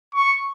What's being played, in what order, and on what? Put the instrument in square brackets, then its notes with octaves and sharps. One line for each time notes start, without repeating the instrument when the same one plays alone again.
[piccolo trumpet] C#6